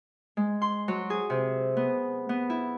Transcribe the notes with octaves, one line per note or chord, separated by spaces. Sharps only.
G#3
C6
F#3
G#4
C3
B3
B3
E4